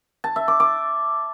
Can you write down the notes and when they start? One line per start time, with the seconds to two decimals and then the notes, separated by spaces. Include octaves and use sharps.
0.24 A5
0.36 E5
0.48 D6
0.60 D6